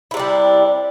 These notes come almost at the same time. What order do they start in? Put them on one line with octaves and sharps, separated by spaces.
E4 C3 D4 G3